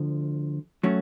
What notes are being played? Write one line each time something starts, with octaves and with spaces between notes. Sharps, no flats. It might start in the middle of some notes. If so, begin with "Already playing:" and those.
Already playing: D2 D3 F3
F#3 A3 C#4 F#4